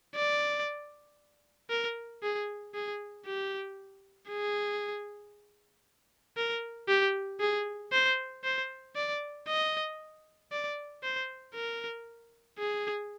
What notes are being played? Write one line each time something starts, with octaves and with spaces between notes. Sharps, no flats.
D5
A#4
G#4
G#4
G4
G#4
A#4
G4
G#4
C5
C5
D5
D#5
D5
C5
A#4
G#4